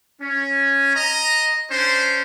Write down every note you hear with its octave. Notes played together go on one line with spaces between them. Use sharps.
C#4
D#5 A#5
C#4 D4 C5